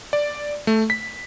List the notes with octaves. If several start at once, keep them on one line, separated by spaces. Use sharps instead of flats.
D5
A3
B6